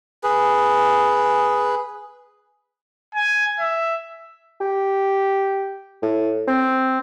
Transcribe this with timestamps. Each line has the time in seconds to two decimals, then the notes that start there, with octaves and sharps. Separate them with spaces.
0.23 G#4 B4
3.15 G#5
3.60 E5
4.61 G4
6.03 A2
6.48 C4